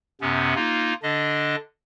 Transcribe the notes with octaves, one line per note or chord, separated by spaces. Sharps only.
F#2 C3 B3 C#4
A#3 D#4 F4
D3 D4 D#5